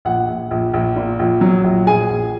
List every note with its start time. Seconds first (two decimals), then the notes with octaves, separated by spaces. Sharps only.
0.05 A#1 F#5
0.28 A#1
0.51 A#1
0.74 A#1
0.96 A#2
1.19 A#1
1.41 F#3
1.64 A#1
1.87 A#1 G#4 G#5
2.10 A#1